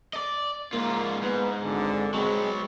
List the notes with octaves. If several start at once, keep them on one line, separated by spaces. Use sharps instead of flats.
D5 D#5
G#2 A#3 F4
G#2 B3
G#1 D3
F#3 G#3 B3 C4